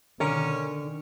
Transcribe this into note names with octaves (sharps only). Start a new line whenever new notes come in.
B2 D3 D#3 C#4 A#4